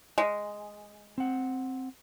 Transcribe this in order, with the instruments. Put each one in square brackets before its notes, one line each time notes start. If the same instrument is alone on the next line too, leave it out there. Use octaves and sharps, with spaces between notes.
[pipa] G#3
[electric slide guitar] C4 F#5